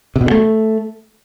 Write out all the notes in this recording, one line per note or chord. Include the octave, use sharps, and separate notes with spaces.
C3
B2
D3
A3